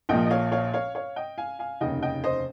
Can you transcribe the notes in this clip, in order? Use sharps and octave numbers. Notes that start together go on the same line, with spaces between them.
A#1 A#2 F3 D#5 G5
D#5
C#5 F5
C#5 F5
C#5 F5
C#5 F5
D#5 G5
F5 G#5
F5 G#5
F1 D#2 C#3 D#5 G5
D#5 G5
C5 D#5